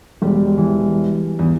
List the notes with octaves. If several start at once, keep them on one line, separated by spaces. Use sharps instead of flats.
E1 G3
E3
E2